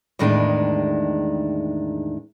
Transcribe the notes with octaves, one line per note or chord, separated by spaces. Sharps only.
E2 A2 D#3 G#3 D4